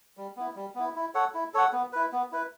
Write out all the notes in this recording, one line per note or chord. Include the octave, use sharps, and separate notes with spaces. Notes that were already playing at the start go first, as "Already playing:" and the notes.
G3
B3 E4
G3
B3 E4
E4
A4 C#5 F#5
E4
A4 C#5 F#5
B3
E4 B4
B3
E4 B4